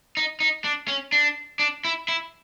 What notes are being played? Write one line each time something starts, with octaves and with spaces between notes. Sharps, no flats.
D#4
D#4
D4
C#4
D4
D4
E4
E4